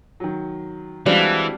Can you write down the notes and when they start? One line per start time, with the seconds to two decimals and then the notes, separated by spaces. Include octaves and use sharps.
0.20 D#3 F#3
1.06 E3 G3 G#3 C4 D4 F#4 F5